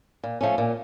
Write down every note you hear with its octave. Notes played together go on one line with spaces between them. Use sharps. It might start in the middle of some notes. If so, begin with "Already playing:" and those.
A#2
F3 A3 C#4
A#2